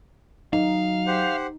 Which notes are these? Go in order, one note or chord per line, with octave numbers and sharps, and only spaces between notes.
F#3 D#4 F5
G4 C5 F#5